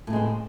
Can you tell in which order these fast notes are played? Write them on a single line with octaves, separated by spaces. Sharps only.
A2 C#3 G#3 C4